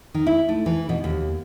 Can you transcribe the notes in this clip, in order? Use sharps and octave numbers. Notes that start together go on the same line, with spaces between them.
D#3
E4
A3
E3
B2
D#2